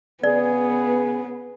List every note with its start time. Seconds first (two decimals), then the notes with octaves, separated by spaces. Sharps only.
0.24 C#3 B3 G#4 B4 D5